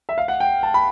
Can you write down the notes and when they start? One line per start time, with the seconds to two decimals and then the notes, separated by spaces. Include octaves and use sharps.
0.09 E5
0.18 F5
0.28 F#5
0.40 G5
0.63 A5
0.74 B5